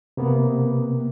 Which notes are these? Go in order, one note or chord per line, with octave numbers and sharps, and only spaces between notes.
C3 A#3 B3